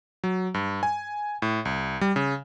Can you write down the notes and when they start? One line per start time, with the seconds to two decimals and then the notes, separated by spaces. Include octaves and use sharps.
0.24 F#3
0.54 G2
0.83 G#5
1.42 A2
1.65 C2
2.01 G3
2.16 C#3